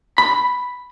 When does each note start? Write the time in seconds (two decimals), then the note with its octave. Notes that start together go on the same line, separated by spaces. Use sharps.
0.18 B5